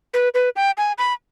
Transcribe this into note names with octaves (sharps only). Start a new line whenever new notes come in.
B4
B4
G5
G#5
B5